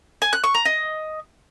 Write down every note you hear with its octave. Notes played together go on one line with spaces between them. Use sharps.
G#5
F#6
C#6
A#5
D#5